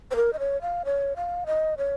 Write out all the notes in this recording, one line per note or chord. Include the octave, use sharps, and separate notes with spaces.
C5
A#4
D#5
C#5
F5
C#5
F5
D#5
C#5